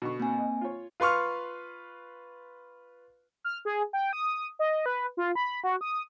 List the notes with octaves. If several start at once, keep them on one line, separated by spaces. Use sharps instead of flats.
B2 D3 C#6
A#3 C4 G#5
D#5
F4 C#5
F4 B4 C6 C#6 F6
F6
G#4
G5
D#6
D#5
B4
F4
B5
F#4
D#6